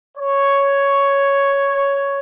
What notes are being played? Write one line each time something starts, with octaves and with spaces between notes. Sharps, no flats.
C#5